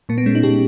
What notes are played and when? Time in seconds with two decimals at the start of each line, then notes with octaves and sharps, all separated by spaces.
0.09 A#2 A#3
0.18 B3
0.26 G#3 C#4
0.35 D#4
0.43 A#2 G4